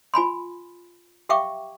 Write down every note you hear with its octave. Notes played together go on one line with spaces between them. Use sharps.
F4 G#5 B5 C6
G4 E5 F5 G5 C#6 D6